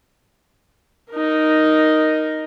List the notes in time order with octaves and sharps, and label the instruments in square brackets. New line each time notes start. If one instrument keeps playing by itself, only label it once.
[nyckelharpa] D#4 A#4